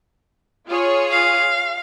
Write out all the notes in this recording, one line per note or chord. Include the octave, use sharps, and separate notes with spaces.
F4 G#4 C#5
F5